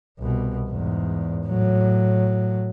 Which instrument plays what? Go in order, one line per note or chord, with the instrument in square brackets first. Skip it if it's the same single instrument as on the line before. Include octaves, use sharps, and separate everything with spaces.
[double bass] C2 B2
E2 G#2
A2 F#3